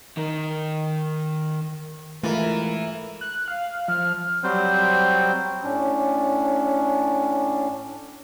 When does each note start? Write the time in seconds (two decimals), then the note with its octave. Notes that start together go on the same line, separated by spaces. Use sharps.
0.17 D#3 A#4
2.23 G#2 E3 A3 F4 A#4
3.21 F#6
3.48 F5
3.88 F3 F6
4.44 F#3 G3 C4 C5
5.64 A2 C#4 D4